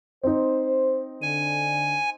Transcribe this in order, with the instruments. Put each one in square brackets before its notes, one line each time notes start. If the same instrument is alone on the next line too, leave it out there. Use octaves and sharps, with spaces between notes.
[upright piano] C4 D#4 [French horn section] C5
[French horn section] D3 [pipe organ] G#5